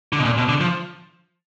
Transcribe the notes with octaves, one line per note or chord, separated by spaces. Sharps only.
D3
B2
A#2
B2
D3
F3